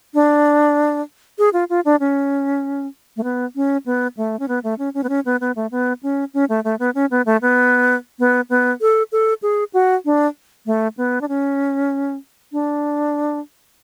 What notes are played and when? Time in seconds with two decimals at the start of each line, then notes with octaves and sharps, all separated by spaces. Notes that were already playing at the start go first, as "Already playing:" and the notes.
0.14 D4
1.39 G#4
1.53 F4
1.70 F4
1.85 D4
2.00 C#4
3.17 A3
3.24 B3
3.56 C#4
3.86 B3
4.17 A3
4.39 C#4
4.48 B3
4.64 A3
4.79 C#4
4.94 C#4
5.04 B3
5.09 C#4
5.25 B3
5.41 B3
5.56 A3
5.71 B3
6.03 C#4
6.34 C#4
6.49 A3
6.64 A3
6.79 B3
6.95 C#4
7.11 B3
7.26 A3
7.42 B3
8.19 B3
8.50 B3
8.81 A4
9.12 A4
9.43 G#4
9.74 F#4
10.05 D4
10.66 A3
10.97 B3
11.21 D4
11.28 C#4
12.52 D4